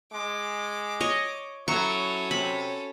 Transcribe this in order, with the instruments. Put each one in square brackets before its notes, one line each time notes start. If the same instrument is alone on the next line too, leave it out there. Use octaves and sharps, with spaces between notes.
[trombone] G#3 [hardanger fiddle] D6
[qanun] C#5 D#5
[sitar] F#3 [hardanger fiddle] C#4 A4 [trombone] E4 [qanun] C#6
[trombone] C3 [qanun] B5